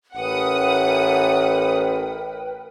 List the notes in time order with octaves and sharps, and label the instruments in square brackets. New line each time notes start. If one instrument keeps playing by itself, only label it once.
[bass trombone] A1 [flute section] A#4 B4 G5 [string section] F#5 D#6